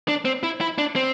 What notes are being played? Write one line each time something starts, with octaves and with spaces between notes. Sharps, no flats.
D4
C4
E4
E4
D4
C4